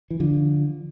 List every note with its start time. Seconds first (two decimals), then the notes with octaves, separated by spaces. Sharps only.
0.11 E3
0.20 D3 F3